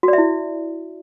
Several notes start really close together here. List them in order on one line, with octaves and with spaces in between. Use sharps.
F#4 D5 E5 E4